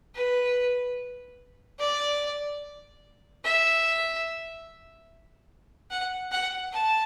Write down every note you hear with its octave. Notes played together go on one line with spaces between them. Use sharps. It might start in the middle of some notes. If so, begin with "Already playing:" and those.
B4
D5
E5
F#5
F#5
A5